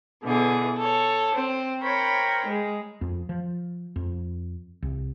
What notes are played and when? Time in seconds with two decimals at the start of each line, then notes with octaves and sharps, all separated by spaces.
0.23 B2 D3 E3 G#4
0.76 A4 C#5
1.32 C4
1.82 A#4 C5 C#5 G5 B5
2.45 G#3 G#4
3.01 F2
3.29 F3
3.96 F2
4.82 C2